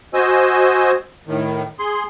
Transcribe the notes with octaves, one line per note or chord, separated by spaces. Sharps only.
F#4 C5 D#5 G#5 E6
A2 D#3
G#4 C6